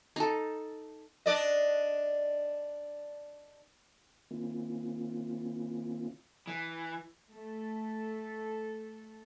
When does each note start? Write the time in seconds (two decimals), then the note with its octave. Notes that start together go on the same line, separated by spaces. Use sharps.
0.16 D#4 A4
1.26 D4 D5 D#5
4.31 D#3 A#3 C4 C#4 E4 F4
6.47 E3
7.29 A3 A4